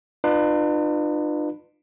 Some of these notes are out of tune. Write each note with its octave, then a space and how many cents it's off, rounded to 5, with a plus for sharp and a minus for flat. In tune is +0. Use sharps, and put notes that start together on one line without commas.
D4 +45 F4 +0 B4 +0